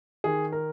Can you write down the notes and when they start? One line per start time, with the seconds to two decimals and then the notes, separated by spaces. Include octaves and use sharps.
0.24 D#3 G#4
0.52 A#4